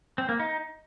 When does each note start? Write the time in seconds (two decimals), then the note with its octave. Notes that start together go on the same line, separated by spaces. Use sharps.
0.18 C4
0.29 A#3
0.39 D#4